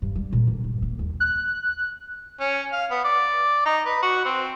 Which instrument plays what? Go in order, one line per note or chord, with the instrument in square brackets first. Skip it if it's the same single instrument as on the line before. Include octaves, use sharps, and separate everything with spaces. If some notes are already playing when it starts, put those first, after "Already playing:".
[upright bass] G2
G3
A#2
D3
G2
A#3
D#2
[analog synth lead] F#6
[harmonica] C#4
F5
B3
D5
D#4
B4
F#4
C4